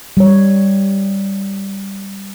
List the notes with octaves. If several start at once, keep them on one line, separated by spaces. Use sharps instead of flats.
G3 C#5